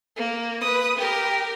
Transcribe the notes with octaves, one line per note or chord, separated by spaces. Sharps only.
A#3
B4 D#6
G4 A#4